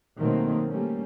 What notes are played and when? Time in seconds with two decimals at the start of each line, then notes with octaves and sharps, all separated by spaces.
0.17 B2 D#3 F#3 A3 A#3 C4
0.68 G3 A3 A#3 C#4